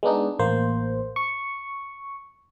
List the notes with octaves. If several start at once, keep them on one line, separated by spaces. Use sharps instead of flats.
G#3 B3 D4 D#4
A1 A#3 C5
C#6